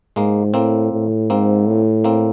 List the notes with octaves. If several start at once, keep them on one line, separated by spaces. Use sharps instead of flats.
G#2 G#3 A#3
A2 A#3 C4
A2
G#2 A#3 C4
A2
A#3 C4